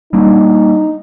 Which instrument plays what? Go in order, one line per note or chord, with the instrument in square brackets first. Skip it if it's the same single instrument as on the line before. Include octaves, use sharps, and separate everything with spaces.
[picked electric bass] G3 A#3 D4 [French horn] D#4